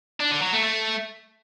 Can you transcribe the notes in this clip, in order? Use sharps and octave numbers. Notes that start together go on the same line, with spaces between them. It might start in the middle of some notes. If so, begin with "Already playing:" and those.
D4
D3
F#3
A3
A3